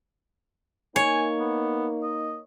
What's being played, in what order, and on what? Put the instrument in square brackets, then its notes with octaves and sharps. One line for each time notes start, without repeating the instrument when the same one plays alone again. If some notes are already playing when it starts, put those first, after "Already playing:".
[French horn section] A#3 D#4 [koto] C#5 [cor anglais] G#5
[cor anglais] B3
D#5